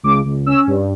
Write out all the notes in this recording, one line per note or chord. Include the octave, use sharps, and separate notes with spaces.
C#2 D6
C#2
C#4 E6
G2